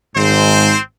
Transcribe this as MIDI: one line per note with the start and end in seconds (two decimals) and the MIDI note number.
0.16 0.74 32
0.16 0.74 44
0.16 0.80 60
0.16 0.80 72